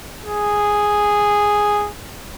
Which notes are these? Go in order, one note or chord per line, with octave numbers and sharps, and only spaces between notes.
G#4